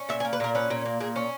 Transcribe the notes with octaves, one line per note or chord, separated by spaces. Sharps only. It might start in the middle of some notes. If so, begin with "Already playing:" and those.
Already playing: C#4
A#2 E5
G#5
A#3
B4
A#2 A#4
C#4 B4
A#2
A#3
A#2 G#4
C#4